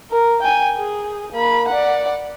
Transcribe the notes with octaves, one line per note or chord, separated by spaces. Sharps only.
A#4
G5 G#5
G#4
A#3 B5
D5 F#5